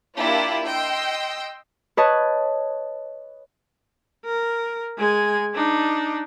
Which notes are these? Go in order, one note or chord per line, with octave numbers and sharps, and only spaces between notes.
A#3 D4 E4 F4 G4
D#5 G5 C6 E6
B4 C#5 D#5 A5
A#4
G#3 G#5
D4 D#4